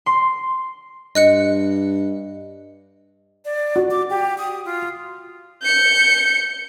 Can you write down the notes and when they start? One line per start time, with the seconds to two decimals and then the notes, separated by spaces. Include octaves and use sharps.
0.06 C6
1.15 G2 D#5 F#6 C#7
3.45 D5
3.76 F#4
3.91 D6
4.10 G4
4.38 D#6
4.65 F4
5.63 G6 C#7